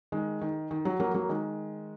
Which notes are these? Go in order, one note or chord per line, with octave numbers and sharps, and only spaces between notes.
D#3 G#3
D#3
D#3
F#3
F#3 A#3
F#3 A#3
D#3 G#3